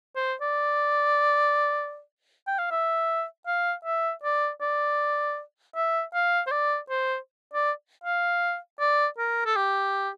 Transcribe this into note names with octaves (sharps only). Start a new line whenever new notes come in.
C5
D5
G5
F5
E5
F5
E5
D5
D5
E5
F5
C5
D5
C5
D5
F5
D5
A#4
A4
G4